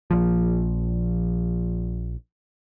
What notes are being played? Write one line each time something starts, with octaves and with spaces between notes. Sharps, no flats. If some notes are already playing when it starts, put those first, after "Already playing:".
A#1 F3